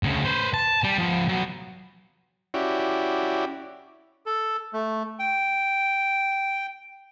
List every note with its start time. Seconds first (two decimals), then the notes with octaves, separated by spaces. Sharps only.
0.03 D2 C#3
0.25 B4 C5
0.54 A5
0.84 G3
0.98 F3 B3
1.28 F#3 B3
2.54 C#4 E4 F#4 G4 D5
4.26 A4
4.73 A3
5.19 G5